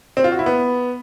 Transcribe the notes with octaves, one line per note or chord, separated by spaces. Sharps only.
C4
F4
F#4
E4
B3